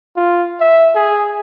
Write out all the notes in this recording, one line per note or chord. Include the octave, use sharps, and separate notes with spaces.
F4
E5
G#4